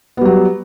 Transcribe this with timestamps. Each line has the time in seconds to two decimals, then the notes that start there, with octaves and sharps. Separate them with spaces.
0.17 B3
0.21 G3
0.25 F#3